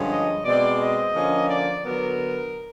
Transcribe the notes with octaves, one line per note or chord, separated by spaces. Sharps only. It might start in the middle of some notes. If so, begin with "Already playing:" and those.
Already playing: G2 D3 F3 G#3 C#4
D#5
B2 G#3 C4 D5
D#5
D3 F3 A#3 C#4
D5
D3 F#3 B3 A#4